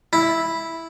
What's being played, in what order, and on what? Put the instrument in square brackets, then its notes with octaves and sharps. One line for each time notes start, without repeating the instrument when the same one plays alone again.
[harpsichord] E4